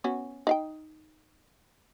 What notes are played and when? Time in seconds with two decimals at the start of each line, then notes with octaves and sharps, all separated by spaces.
0.04 B3 C#4 F#4
0.47 D#4 F5 G5